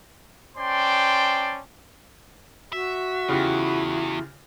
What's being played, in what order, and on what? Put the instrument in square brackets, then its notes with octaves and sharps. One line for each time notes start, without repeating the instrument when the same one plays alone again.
[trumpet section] C#4 C5 D5 G5 A5 C6
[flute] F#4 [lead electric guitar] E5
[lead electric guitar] E2 [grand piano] C#3 F4 G4 [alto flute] E4